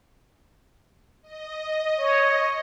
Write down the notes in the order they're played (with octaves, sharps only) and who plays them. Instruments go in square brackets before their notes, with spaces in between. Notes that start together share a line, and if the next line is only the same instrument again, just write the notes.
[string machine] D#5
[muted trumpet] C#5